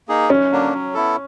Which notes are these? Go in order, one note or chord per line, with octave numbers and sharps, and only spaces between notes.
A#3 D#4 G#4
F#2 C#4
D3 F#3 A#3 D4
F#3
B3 E4 A4